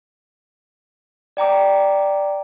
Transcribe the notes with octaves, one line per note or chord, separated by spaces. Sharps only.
D5 G5 A#5 D6